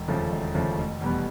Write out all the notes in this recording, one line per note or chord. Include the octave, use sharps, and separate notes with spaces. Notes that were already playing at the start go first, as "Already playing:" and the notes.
Already playing: E1
D#2 C#3 F3 A3
E1
D#2 C#3 F3 A3
F1
E2 B2 G3 B3